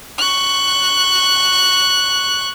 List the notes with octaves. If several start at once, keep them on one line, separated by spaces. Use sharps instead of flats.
C#6 F#6